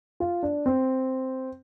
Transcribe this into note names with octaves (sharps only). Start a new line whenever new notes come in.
F4
D4
C4